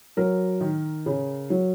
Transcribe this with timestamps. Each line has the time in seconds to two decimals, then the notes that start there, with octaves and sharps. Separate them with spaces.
0.17 F#3 A#4
0.61 D#3
1.06 C#3
1.50 F#3